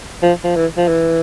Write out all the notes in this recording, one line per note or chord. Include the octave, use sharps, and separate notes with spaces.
F3
F3
E3
F3
E3